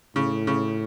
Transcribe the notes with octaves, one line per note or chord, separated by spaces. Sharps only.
A2 C#3
C#3